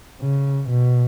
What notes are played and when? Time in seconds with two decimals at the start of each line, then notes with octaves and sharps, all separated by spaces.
0.22 C#3
0.70 B2